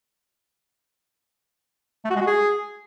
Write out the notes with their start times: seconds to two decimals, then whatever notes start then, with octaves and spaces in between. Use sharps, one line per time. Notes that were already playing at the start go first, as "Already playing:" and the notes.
2.05 A3
2.10 F#4
2.16 G#3
2.21 F#4
2.27 G#4